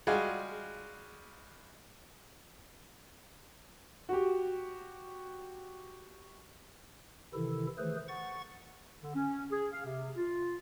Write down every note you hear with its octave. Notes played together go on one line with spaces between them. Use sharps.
G3 G#3 F4 F#4 G#4
F#4 G4
C3 D#3 E3 E4 A4
D#3 E3 A3 G#4 B4 C5
F#5 C#6 A6
D3
C#4
G#4
F5
C3
F4